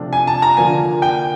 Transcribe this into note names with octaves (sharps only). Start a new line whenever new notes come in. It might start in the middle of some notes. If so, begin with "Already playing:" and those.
Already playing: C3 F3 A3 D4 F4
G#5
A5
A#5
D3 F3 A#3 D4 F4 G#5
G5